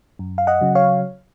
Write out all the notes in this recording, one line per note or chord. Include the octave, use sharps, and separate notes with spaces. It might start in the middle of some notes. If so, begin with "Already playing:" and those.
F#2
F5
D#5 F#5
C#3 F#3
C#5 F5